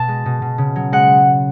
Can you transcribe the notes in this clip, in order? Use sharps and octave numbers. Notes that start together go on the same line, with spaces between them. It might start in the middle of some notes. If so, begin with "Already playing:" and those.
Already playing: B2 A5
G#3
B2
B2
C#3
F#3
G#3 F#5